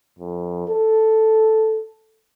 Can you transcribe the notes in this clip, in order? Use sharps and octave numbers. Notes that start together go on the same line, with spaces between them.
F2
A4